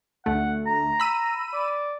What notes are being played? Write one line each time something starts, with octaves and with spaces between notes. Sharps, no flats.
D2 A3 F#5
A#5
B5 E6 D#7
D5